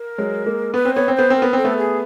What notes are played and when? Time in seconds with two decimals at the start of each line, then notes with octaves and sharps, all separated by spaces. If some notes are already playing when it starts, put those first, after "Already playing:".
Already playing: A#4
0.18 F#3 G#3
0.46 G#3 A#3
0.74 B3 B4
0.85 C4
0.94 B3 C#5
1.08 C4
1.15 B3 C5
1.30 C4
1.35 A#4
1.42 B3
1.53 C4 A4
1.64 A3 B3
1.77 G#4